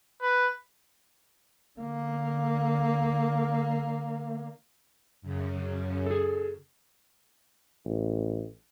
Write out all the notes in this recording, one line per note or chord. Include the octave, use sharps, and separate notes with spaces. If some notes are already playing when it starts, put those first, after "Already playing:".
B4
D3 A#3
F#2 C#3
G#4 A4
A1